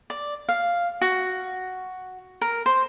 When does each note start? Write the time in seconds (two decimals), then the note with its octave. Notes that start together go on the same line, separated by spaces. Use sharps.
0.10 D5
0.49 F5
1.01 F#4
2.41 A#4
2.66 C5